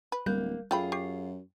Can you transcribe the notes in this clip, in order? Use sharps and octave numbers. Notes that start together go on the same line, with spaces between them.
B4
D1 G3 A#3 F#6 G6
F#2 A3 F4 G#4 G5 B5
G4 C#6 C7